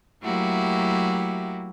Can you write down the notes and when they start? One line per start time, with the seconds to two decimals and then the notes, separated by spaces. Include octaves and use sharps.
0.21 F#3 A3 A#3 E4 F#4 G4